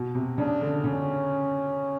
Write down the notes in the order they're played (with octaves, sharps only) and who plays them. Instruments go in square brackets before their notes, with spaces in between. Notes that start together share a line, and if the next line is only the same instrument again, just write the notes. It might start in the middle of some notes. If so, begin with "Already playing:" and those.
Already playing: [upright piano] B2
C3
[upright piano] C#3 [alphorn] D4
[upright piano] D3
[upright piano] C#3 [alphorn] C#4